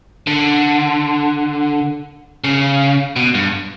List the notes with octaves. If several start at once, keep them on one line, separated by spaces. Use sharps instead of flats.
D3
C#3
B2
G2